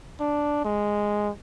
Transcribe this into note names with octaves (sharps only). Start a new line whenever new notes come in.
D4
G#3